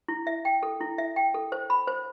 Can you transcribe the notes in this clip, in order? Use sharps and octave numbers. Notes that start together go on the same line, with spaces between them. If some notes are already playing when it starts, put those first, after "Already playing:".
E4
E5
G5
A4
E4
E5
G5
A4
C5
B5
C5